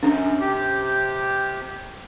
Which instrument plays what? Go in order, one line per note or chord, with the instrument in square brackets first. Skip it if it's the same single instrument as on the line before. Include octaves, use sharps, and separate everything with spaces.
[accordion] F#2 [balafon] C#4 D4
[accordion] C3 G4